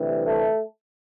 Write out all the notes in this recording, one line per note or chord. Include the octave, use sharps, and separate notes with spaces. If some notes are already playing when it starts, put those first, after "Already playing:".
Already playing: D2 C3 E3 G3
A3 A4